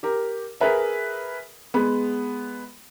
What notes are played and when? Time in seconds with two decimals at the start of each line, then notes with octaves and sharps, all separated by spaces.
0.03 G4 A#4
0.61 G#4 A#4 B4 E5
1.74 G#3 B3